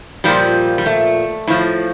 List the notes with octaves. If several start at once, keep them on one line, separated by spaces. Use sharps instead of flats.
A#2 F3 G3
G3
A3
A2 F3